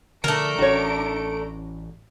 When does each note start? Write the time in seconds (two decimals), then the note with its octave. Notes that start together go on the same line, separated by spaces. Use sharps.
0.24 D3 F3 A3 D4 A#4 A#5 D7
0.59 A1 E3 C#4 F#4 C#5